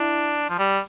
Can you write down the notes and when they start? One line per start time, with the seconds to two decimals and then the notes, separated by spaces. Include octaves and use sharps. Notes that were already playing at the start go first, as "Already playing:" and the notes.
Already playing: D4 E4
0.49 F3
0.59 G3